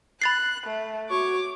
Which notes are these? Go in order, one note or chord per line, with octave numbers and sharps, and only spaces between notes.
B5 F#6 A6 C7
A3
F#4 C#5 C#6 D6